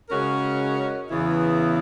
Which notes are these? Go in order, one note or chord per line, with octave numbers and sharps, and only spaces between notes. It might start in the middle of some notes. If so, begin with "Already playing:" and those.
C#3 G#3 C#4 F#4 A#4
E2 C#3 E3 B3 E4